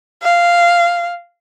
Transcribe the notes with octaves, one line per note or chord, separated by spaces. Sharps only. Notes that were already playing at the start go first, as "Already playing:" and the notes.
F5